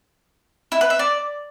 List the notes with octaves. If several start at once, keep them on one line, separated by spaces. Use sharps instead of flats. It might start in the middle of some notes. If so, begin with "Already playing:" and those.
E4
B4
E5
D5